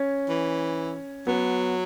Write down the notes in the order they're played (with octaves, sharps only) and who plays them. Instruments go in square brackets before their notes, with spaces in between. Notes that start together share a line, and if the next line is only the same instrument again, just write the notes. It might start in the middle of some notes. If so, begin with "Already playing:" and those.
Already playing: [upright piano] C#4
[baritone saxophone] E3
[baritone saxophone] F#3 [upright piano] B3